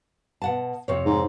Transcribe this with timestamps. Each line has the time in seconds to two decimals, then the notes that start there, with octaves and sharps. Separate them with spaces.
0.42 B2 F#5 A5
0.88 F2 C3 C#5
1.06 G#2